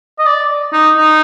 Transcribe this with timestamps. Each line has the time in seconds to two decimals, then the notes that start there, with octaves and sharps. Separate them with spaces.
0.19 D#5
0.26 D5
0.73 D#4
0.97 D#4